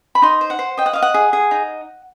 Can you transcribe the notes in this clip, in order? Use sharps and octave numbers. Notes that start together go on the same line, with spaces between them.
B5
D#4 C6
C5
F#5
C5
D#5 G5
F#5
D#5 F5
F#5
G#4
G#4
D#4